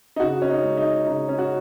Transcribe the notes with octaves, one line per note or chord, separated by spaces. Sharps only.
D#4
C#3 F#4
C#4
D#4
G#3
D#4
C#3 D#4
C#4
F#4